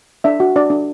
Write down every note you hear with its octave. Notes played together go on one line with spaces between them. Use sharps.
D4 E5
F#4
D4 D5
D4